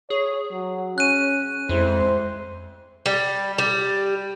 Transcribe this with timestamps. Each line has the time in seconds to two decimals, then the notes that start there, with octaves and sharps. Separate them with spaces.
0.10 G#4 C#5
0.52 F#3
0.98 C#4 F#6 D#7
1.69 F2 G#3 E4 C5
3.06 G3
3.58 G3